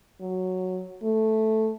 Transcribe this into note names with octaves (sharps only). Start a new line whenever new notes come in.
F#3
A3